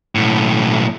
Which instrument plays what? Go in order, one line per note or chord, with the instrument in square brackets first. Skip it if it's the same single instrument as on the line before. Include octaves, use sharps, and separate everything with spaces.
[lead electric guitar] B1 A2